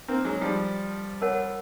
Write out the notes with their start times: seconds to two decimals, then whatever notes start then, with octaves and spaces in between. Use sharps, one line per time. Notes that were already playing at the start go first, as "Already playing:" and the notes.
0.08 A#3 C4
0.25 F#3 G#3
0.41 F3 G3
1.22 A#4 C#5 F#5 A5